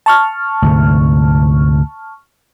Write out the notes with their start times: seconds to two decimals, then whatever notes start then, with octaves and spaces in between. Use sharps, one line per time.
0.06 A5 C#6 F6
0.62 D2 G#2 C3